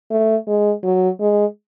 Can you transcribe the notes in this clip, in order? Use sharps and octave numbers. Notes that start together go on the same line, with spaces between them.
A3
G#3
F#3
G#3